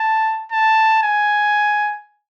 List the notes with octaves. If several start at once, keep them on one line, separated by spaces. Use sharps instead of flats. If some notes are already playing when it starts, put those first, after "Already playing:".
Already playing: A5
A5
G#5